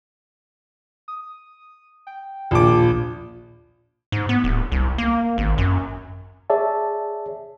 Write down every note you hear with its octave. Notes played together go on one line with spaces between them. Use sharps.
D#6
G5
A#1 D#2 F4 A5 D6
G#2
B3
D1
C2
A#3
G#1
F#2
G#4 C#5 D5 E5 A5